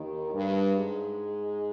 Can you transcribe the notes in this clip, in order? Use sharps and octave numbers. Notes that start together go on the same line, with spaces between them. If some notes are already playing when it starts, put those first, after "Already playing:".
Already playing: D#2 D#3
G2 G3
G#2 G#3